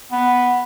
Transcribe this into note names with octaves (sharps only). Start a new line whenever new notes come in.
B3